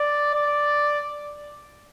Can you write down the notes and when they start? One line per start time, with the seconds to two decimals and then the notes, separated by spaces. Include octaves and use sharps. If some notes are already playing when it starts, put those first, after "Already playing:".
Already playing: D5
0.34 D5